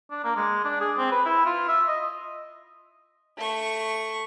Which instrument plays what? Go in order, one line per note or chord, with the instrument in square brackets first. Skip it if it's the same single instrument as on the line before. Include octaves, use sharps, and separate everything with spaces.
[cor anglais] D4
A#3
G#3
D4
G#4
C4
B4
E4
F4
E5
D#5
[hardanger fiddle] A3 C#6